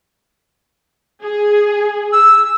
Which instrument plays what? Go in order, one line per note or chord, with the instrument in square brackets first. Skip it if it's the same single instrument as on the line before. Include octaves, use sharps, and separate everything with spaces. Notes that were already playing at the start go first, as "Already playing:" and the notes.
[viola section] G#4
[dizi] E6